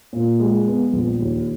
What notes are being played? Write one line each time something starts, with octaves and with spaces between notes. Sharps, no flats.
A#2
G#3
B3
A#1
D#2